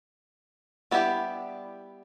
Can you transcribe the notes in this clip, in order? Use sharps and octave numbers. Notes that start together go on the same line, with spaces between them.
G3 B3 D4 E4 G4